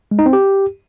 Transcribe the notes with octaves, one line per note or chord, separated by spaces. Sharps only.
G#3
D#4
C4
G4